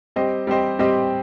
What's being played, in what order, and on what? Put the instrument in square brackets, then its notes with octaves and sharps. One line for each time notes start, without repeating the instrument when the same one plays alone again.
[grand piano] G3 C4 G4 C5 D#5
G3 C4 G4 C5 D#5
G3 C4 G4 C5 D#5